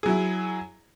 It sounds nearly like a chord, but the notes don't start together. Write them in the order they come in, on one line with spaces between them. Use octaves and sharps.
G#4 F#3 E4